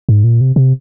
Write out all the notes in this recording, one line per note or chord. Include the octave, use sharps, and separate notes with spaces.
G#2
A#2
C3
C3